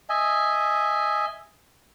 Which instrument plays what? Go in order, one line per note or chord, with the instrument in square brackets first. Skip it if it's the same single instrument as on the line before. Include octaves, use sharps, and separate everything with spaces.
[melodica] D#5 E5 G#5